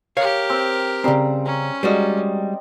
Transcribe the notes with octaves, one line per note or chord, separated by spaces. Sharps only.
G4 A#4 C#5 F5
C4
C#3 G3 C4 A#5
C#4 A#5
G3 G#3 F#4 D5 D#5